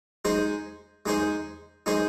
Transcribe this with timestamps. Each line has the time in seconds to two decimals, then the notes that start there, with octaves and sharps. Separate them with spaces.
0.25 G#3 D#4 G#4 C5
1.06 G#3 D#4 G#4 C5
1.86 G#3 D#4 G#4 C5